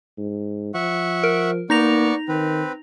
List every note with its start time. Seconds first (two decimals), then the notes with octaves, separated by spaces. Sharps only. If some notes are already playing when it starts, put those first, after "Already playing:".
0.18 G#2
0.74 F3 E5 F#5 C#6
1.24 A#4
1.70 A#3 B3 D#4 D5 C#6 A#6 F7
2.28 D#3 C4 B4